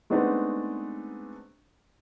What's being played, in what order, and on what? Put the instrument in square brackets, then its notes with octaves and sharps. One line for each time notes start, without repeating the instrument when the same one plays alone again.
[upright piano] G#3 A3 B3 C4 D4 D#4